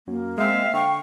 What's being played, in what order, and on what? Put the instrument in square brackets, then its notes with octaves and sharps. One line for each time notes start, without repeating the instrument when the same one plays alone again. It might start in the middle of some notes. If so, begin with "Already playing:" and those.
[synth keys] F#2 [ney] A#3
[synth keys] G#3 C4 [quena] E5 [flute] F5
[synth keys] D3 [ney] G5 [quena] C#6